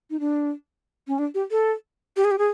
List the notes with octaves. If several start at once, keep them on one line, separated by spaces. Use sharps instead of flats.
D#4
D4
C#4
D4
G4
A4
G4
G#4
G4
G#4